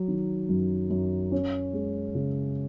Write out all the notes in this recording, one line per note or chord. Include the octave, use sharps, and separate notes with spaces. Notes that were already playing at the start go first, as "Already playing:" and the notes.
Already playing: F#3
D#3
F#2
F#2
C#4
G#3
C#3